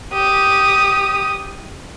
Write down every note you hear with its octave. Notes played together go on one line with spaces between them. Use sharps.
G4 D#6